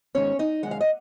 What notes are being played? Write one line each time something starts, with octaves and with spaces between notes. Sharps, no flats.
G#2 D#3 G#3 C#4 C#5
D#4 D#5
F#2 D#3 G#3 F#5
F5
D#5